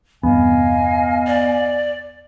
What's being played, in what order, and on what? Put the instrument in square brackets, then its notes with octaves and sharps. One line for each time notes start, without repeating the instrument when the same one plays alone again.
[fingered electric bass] E2 G2 C3 [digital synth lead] B3 [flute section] D#5 F5 G#5
[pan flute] D5